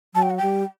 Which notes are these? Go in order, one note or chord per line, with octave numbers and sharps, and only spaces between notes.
F#3 A5
G5
F#5
G3 G5